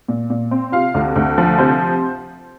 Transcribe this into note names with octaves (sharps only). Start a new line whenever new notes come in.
A#2
A#2
C4
C3 F4 F5
D2
D2
F3
C3 C5